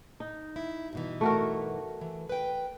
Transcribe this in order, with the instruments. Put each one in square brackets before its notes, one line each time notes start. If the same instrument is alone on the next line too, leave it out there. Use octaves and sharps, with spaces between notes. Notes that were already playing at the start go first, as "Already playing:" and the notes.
[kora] D#4
[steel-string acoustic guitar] E4
G2 B2 E3
[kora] A3 F#4 A#4
[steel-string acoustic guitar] E3
B4 G5